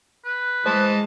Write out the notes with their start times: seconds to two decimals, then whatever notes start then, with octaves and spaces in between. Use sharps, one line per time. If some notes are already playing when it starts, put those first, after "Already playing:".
0.25 B4
0.66 E3 G#3 C5 D#5 A5